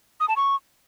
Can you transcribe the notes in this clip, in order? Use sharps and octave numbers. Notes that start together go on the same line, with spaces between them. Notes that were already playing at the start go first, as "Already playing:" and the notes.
D#6
A5
C#6